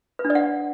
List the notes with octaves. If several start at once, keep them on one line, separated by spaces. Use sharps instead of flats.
B4
D4
D5
F#5